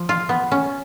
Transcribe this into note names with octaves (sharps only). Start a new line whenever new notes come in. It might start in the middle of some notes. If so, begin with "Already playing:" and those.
Already playing: F3
F4
B3
C#4